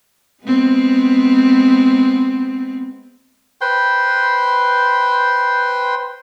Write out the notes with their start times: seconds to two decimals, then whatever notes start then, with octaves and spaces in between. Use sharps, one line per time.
0.43 G#3 B3 C4
3.61 B4 C5 G5 C6